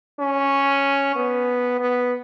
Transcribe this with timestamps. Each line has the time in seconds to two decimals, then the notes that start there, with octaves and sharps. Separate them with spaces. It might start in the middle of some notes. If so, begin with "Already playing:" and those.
0.19 C#4
1.16 B3
1.80 B3